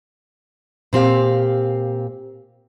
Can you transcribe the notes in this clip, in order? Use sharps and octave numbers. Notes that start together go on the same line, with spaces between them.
A#2 C4 G4 F5